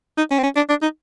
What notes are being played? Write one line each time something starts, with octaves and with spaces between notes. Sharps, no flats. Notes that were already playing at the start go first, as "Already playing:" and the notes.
D#4
C#4
C4
C#4
D4
D4
D#4